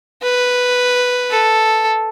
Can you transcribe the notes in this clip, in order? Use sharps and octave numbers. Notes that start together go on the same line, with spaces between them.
B4
A4